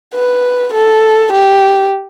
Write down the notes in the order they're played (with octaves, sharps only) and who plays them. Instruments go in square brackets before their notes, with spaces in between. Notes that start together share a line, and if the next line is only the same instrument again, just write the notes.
[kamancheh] B4
A4
G4